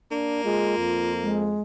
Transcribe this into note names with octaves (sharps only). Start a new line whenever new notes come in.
A#3 D4
G#3 F4
F2
G#3